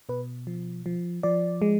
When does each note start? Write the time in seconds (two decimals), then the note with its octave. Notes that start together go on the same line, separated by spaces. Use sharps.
0.09 B2 B4
0.47 F3
0.86 F3
1.23 F3 D5
1.62 G#3